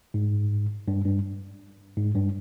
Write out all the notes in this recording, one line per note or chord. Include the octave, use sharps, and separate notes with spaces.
G#2
G2
G2
G#2
G2